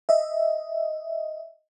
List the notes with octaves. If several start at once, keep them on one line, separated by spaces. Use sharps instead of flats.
D#5 E5